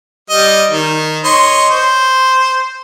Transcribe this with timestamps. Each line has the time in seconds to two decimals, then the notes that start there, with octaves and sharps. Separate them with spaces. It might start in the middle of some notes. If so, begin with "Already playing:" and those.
0.30 G3 D#5
0.71 D#3
1.24 C#5 D#5 C6
1.70 C5